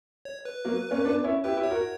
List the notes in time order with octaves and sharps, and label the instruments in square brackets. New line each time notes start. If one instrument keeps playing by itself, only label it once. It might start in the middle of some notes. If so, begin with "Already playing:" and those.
[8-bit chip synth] C#5
B4
[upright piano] F#3 A#3
A#3 C#4
B3 D4
C#4 E4
[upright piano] E4 G4 [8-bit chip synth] B4
[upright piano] E4 G4
[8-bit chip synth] C#5
[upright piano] F#4 A#4